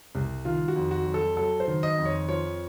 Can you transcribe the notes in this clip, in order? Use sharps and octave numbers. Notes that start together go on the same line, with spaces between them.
C2
D#3 F4
F#4
F2
F#4
F#3
A4
F#3 A4
C5
D#3
D#5
F2
C#5
F3 C#5